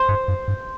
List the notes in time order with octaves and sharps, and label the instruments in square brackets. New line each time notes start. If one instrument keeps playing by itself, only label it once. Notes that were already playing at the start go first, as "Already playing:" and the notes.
Already playing: [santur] C5
[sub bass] G2
F#2
G2